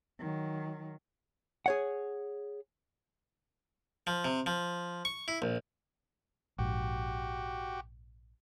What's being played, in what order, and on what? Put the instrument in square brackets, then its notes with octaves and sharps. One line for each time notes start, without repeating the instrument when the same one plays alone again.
[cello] D#3 F#3
[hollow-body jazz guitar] G#4 C#5 F#5
[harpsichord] F3
C3
F3
C#6
E4
A#1
[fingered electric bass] A#1 G#2 [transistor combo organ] F#4 G4